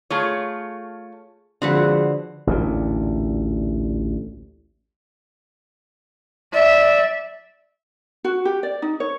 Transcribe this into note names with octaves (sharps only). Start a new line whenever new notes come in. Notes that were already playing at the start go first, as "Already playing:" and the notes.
A3 F4 G#4 C#5
D3 F3 G#3 C4 F#4 B4 F#5
A1 D2 A#2
D5 E5
F#4
G4
D5
D#4
C#5